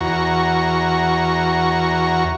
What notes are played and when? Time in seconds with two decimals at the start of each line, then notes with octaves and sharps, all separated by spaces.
0.01 E2 F#4 A#5 C#6